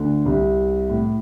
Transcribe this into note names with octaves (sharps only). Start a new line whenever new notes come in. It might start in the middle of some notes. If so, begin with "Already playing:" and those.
Already playing: D2 D3
C2 C3
A2